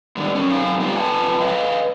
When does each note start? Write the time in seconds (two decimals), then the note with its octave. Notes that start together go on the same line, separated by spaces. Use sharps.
0.16 G#2 D#3 G3 D4
0.35 F#3 C#4
0.50 F#2 C4 D#4 F5 G#5
0.80 G3 B3 F4 G4 B4 F5
0.95 F2 F3 B4 G#5 A5
1.41 B4 D#5 F5